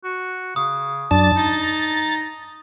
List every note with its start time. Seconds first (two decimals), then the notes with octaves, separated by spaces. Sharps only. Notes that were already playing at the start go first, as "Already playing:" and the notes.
0.04 F#4
0.56 C#3 D#6
1.11 F#2 D4 A5 A6
1.36 D#4 A6
1.63 A#5